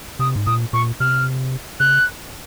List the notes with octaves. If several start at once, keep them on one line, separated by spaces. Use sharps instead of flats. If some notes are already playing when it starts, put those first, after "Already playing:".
C3 D#6
G#2
A#2 D#6
A#2 C#6
C3 F6
C#3 F#6